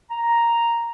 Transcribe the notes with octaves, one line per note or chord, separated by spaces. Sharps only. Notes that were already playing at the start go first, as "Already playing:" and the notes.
A#5